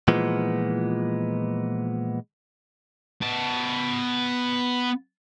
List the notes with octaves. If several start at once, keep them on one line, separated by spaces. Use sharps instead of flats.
A#2 E3 F3 G#3 B3
B3 A5